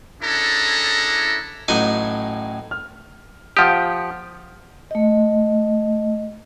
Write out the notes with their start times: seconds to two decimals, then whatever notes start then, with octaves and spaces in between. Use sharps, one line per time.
0.22 C#4 D4 E4 G#4 A4 A#5
1.68 A1 A2 F#3 D#4 G#5
2.71 F6
3.57 F3 G4 F5 F#5 D#6
4.91 A3 D#5